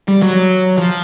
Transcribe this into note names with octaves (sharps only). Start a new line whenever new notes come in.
G3
F#3
F3